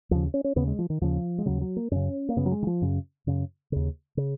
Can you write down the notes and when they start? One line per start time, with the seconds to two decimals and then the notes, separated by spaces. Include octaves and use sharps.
0.11 D#2 C#3 F3
0.34 C#4
0.44 C#4
0.56 D#2 C#3 B3
0.67 G#3
0.79 F3
0.90 D#3
1.01 D#2 C#3 F3
1.38 G#3
1.46 D#2 C#3 F#3
1.61 F#3
1.76 A#3
1.91 F#2 C#3 C#4
2.29 A#3
2.36 F#2 C#3 B3
2.46 F#3
2.52 G#3
2.62 D#3
2.67 F3
2.82 F#2 C#3
3.27 F#2 C#3
3.72 D#2 C#3
4.17 C#3